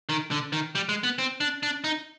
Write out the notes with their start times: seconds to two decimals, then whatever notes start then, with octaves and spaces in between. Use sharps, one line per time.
0.09 D#3
0.31 D3
0.52 D#3
0.75 G3
0.89 G#3
1.03 B3
1.18 C4
1.40 D4
1.63 D4
1.84 D#4